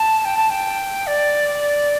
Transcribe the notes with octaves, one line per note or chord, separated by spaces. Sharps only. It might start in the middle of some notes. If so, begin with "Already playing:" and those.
Already playing: A5
G5
A5
G5
D5